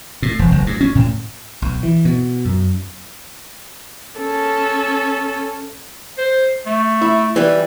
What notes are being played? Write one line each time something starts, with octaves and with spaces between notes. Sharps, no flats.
A2
E1
F#1
G2
C#4
A2
B1
E3
B2
F#2
C#4 A4
C5
A3
E4
E3 G3